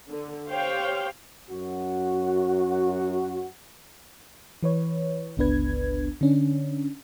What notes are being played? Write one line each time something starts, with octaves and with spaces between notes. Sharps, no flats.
D3
G4 C5 C#5 F5 G5
F#2 F#4
E3 B4 C#5
G1 C#2 B3 D4 B4 G#6
D3 C#4 D4